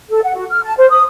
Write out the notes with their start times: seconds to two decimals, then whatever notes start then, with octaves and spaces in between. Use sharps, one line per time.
0.10 A4
0.23 F#5
0.35 F#4
0.50 F6
0.63 A5
0.77 C5
0.90 D#6